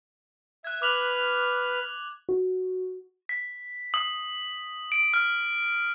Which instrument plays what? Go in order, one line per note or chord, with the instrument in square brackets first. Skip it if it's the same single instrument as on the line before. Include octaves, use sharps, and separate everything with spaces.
[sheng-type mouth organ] E5 [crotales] F#6 G#6
[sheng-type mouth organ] B4 F6 [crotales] D6 F7 F#7
[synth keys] F#4
[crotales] B6
D#6
D7
F6